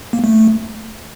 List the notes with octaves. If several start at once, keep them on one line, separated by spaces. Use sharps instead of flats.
A#3
A3